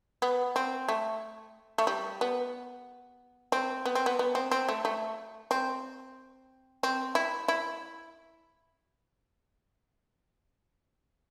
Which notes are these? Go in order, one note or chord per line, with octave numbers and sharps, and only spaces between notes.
B3
C4
A3
A3
G3
B3
C4
B3
C4
B3
B3
C4
C4
A3
A3
C4
C4
E4
E4